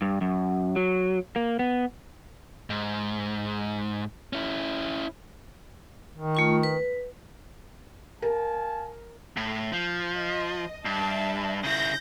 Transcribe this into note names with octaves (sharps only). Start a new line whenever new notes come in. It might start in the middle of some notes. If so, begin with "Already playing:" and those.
G2
F#2
F#3
A#3
B3
G#2
C#4 E4
D#3
A3 F4 C#6
B4
A#4 F5 G#5 A5
A2
F3
D#5
G2 E5 A5
C#3 E4 G6 A#6